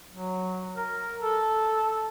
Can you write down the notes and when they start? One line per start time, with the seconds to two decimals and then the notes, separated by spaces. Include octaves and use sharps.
0.13 F#3
0.76 A#4
1.22 A4